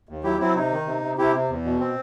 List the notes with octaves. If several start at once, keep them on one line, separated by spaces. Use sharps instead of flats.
D#2
F#3 E4 G4
F#3 C4 E4
C3 D#4
D#3
C3
C3
C3 E4 G4
C3
E2
B2
C4